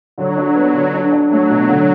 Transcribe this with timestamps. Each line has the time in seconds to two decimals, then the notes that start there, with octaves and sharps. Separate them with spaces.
0.18 D3 F#3
0.37 D4
0.55 B3
0.74 D3
0.93 D4
1.12 D4
1.31 F#3 A3
1.50 B2
1.69 D3